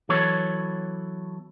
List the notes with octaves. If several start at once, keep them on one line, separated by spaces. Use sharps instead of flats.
E3 F#3 B3 A4 C#5